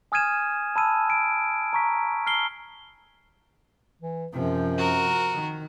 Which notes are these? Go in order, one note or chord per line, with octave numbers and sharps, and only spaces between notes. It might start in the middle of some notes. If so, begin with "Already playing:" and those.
G#5 D#6 F6 G#6 D#7 E7
A5 B5 E6 D#7
D7
A#5 C#6 B6
F6 C7 G7
E3
F#2 C3 F3
F#4 A#4
D#3